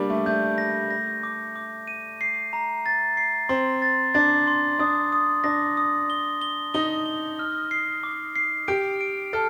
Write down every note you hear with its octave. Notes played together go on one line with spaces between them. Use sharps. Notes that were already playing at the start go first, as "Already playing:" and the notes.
Already playing: G3 A#3 D4 D6
A3
A3 G6
A#6
A#6
D6
D6
D#7
C7
A#5
A6
C7
C4 C6
A6
D4 A6
C6
D4 D#6
D#6
D4 A#6
D#6
G7
G7
D#4 G7
G7
F6
C7
D6
C7
G4 D7
D7
A4 F6